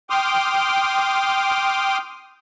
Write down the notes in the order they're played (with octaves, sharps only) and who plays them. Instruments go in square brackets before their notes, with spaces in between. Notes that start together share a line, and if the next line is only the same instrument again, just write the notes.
[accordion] G5 C6 D6 D#6 F6